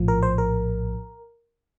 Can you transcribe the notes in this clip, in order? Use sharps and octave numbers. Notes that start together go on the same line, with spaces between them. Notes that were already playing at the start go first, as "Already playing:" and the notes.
Already playing: A#1 A2 F3
A#4
C5
A#4